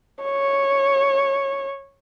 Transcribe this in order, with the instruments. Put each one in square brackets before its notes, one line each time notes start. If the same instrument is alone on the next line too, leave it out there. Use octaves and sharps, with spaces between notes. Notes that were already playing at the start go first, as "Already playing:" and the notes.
[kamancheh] C#5